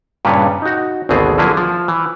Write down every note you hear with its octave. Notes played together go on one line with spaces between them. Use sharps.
G2 A#2 C#3 G3 B4 C#5
D#4 F#4
G#1 D2 B2 B3 C4 G#4
D3 F3 F#3 A#3 E4 G#4
F3
E3